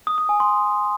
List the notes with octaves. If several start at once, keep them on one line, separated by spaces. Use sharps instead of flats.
D#6
D#6
G#5
C6